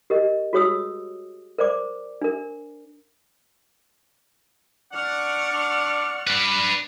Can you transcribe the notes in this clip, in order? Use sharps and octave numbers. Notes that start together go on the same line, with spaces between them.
G4 A#4 D#5
F#4 G#4 C#5 D#6 E6
A#4 C5 D5 D6
D4 A#4
D4 D5 F#5 C#6 F6
D4
G3 D4 B4